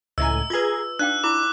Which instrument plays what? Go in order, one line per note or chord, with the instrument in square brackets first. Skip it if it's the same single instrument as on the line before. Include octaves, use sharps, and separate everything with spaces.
[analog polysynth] C#2 A2 G#5 [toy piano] D#5 E5 A#5 [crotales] E6
[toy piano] F4 B4 [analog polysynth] G#4 A#5 G#6
[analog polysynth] D4 [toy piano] D#4 F5 G5 [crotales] F#6
[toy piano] E4 B5 [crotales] D6